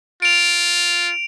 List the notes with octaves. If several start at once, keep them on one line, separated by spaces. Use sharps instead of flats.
F4 D7 F7